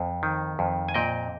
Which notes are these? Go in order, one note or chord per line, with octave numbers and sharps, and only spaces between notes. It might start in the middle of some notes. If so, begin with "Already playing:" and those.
Already playing: F2
D#3
F2
G#5
A#2 D#5 G5